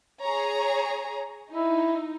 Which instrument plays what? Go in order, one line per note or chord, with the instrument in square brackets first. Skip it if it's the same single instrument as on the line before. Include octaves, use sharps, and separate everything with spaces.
[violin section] G#4 C#5 A#5
[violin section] D#4 [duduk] E4